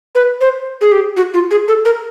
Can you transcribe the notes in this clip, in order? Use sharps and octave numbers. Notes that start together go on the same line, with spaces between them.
B4
C5
G#4
G4
F#4
F4
G#4
A4
A#4